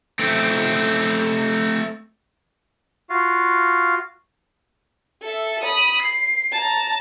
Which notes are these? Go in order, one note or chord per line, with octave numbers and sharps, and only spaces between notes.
A3 C4
F4 F#4 F5
A4 E5
B5 D#6
C7
A5 A#5